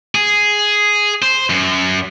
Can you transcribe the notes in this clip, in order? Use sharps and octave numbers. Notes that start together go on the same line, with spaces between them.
G#4
C5
F#2